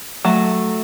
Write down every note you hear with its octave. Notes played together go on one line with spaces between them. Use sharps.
F#3 A3